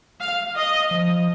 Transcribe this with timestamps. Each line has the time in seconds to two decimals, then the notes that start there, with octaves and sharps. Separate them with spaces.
0.21 F5
0.56 D#5
0.91 F3